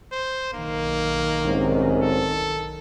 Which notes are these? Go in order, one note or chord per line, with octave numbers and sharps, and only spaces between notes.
C5
B1 D#3 A#3
C2 G#2 C#4
A4